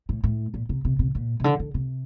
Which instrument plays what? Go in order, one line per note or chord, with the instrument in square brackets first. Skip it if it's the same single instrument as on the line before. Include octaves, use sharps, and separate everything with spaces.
[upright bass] A2
A2
A#2
C3
C3
C3
A#2
C3
D3
D3
C3